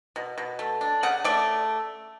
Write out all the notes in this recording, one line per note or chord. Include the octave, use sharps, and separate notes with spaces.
B2
B2
A3
D4
C#3 F#5
A3 D5